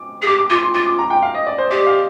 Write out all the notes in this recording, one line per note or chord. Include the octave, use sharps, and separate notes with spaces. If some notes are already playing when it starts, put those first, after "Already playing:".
Already playing: D6
G#4
G4 D6
D6
F4 D6
C6
F4 D6
D6
A#5
G5
F5
D#5
D5
C5
G4 D5
F5